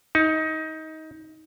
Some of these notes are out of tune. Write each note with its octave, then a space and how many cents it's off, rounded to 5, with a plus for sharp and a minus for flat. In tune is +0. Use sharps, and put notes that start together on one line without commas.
D#4 +20